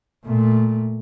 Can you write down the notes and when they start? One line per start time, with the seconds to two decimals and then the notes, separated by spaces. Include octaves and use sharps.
0.24 A#2 A3